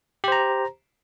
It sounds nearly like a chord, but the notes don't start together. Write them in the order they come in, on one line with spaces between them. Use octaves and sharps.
G4 C5 A#5